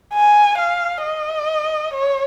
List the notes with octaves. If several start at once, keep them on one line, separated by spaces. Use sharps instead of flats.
G#5
F5
D#5
C#5